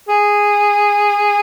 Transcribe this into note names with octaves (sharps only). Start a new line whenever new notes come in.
G#4